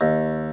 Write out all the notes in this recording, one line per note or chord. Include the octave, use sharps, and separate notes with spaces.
D#2